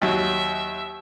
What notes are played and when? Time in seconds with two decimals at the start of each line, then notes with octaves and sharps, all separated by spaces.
0.02 D#2 F#3 E5